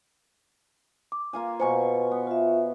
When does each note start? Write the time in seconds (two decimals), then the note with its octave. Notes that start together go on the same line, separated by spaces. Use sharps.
1.12 D6
1.33 A#3 F4 G#5
1.60 B2 C5 G#5 C#6
2.11 B3
2.27 F4 E5